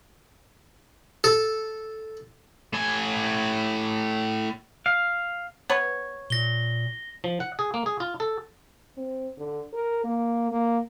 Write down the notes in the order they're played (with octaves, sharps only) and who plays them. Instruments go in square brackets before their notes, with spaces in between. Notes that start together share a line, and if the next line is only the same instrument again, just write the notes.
[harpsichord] A4
[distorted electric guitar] A2 G#5
[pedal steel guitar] F5
[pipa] B3 B4 C#5
[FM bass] A#2 [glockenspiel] A#6 G7
[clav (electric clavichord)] F3
F#5
G#4
A#3
G#4
F4
A4
[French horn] C4
D3
A#4
A#3
A#3